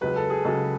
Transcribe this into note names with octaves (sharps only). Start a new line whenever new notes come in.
C#2 C#3 F#3 B4
A4
G#4
C#2 C#3 F#3 A4